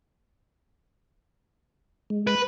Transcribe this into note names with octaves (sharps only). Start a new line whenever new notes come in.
G#3
B4